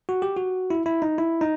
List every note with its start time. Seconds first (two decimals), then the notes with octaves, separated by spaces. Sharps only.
0.09 F#4
0.22 G4
0.37 F#4
0.70 E4
0.86 E4
1.02 D#4
1.18 E4
1.41 D#4